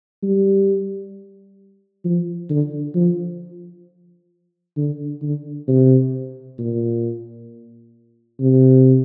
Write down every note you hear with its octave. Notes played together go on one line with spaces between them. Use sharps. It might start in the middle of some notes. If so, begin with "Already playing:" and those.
G3
F3
D3
F3
D3
D3
C3
A#2
C3